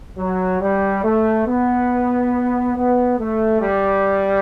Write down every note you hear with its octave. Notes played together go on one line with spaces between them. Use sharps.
F#3
G3
A3
B3
B3
A3
G3